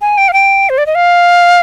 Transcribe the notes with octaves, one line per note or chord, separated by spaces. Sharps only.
G#5
G5
F5
G5
C5
D5
D#5
F5